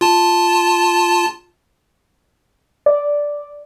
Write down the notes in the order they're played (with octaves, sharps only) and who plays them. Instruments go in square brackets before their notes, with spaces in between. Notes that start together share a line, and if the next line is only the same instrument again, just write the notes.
[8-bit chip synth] F4 A5
[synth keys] D5